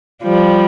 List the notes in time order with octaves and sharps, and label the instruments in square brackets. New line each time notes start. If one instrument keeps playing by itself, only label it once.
[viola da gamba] F3 G3